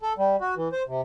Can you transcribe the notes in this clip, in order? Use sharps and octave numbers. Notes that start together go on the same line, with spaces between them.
A4
G3
F#4
E3
C5
C3